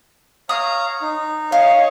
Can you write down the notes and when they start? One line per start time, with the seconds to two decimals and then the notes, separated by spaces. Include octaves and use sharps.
0.49 C#5 F5 A#5 D#6 F6
1.02 D#4
1.52 C#5 D#5 F5